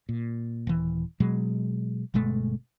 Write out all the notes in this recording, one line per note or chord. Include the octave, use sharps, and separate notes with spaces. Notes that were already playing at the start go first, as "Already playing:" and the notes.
A#2
D#1 E3
B2 F#3 G#3
G1 B2 G#3 A3